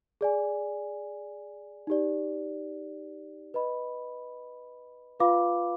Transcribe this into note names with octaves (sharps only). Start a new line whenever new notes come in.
G#4 D5 G#5
D#4 G4 D5
B4 D#5 B5
F4 B4 F5 B5 D6